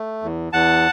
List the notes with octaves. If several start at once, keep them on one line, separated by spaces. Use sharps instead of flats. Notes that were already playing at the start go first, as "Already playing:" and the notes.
Already playing: A3
E2
E2 F#5 A5